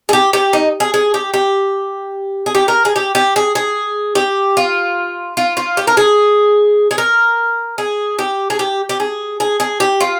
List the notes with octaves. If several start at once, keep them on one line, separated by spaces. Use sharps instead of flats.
G#4
G4
G4
D#4
G#4
G#4
G4
G4
G#4
G4
A#4
G#4
G4
G4
G#4
G#4
G4
F4
F4
F4
G4
A#4
G#4
G#4
A#4
G#4
G4
G#4
G4
G4
G#4
G#4
G#4
G4
F4